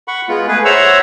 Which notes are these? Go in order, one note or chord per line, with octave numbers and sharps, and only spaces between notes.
F#5 B5 C#6
G#3 B3 F4
A3 G#4 B4
C5 C#5 E5 F#5 A#5 E6